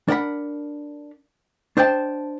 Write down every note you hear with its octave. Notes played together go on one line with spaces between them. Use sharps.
D4 A#4 F#5 B5
D4 C5 D#5 G5 A5